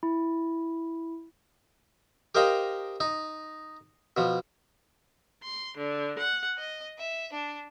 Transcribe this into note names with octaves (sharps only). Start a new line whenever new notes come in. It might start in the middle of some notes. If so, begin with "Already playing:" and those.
E4
G4 A#4 C5 D#5 F5 G5
D#4
B2 F3
C6
D3
F#5
D#5
E5
D4